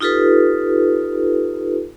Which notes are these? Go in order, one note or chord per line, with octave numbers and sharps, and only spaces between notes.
D#4 F4 G4 A4 B4